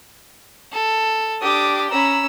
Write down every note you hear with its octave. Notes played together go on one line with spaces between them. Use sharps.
A4
D4 G4 D6 D#6
C#4 A#5 B5 E6